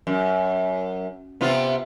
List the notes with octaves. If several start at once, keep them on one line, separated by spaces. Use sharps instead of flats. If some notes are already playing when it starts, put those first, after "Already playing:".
F#2
C3 B3 F4